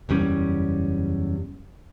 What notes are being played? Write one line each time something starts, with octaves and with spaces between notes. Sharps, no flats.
F#1 E2 G3 C#4